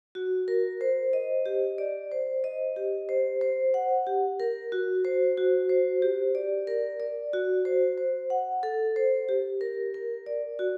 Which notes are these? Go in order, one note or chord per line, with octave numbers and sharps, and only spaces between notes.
F#4
A#4
C5
D#5
G4
D5
C5
D#5
G4
C5
C5
F#5
G4
A#4
F#4
C5
F#4
C5
G4
D5
A#4
D5
F#4
C5
C5
F#5
A4
C5
G4
A#4
A#4
D5
F#4